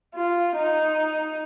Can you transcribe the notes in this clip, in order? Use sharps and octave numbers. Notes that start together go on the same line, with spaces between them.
F4
D#4